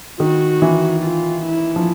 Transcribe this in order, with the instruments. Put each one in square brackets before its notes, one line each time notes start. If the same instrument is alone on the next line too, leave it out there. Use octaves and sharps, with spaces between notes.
[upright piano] D#3 [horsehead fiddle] F#4
[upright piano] E3
[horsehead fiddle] F4
E4
[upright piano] F3